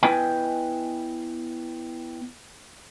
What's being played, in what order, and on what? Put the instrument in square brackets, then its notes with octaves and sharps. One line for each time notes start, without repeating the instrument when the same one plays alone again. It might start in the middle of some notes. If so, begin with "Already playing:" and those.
[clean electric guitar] B3 E4 B4 D#5 G5 G#5